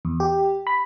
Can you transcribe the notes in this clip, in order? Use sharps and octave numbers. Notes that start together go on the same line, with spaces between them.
E2
G4
B5